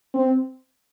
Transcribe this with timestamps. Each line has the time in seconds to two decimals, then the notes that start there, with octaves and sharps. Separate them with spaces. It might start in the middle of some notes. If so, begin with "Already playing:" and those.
0.14 C4